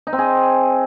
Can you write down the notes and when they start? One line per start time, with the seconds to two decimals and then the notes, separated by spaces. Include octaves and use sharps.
0.07 D#4
0.13 C4
0.19 G#4